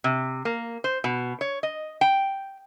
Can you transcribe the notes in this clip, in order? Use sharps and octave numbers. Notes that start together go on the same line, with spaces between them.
C3
A#3
C5
B2
C#5
D#5
G5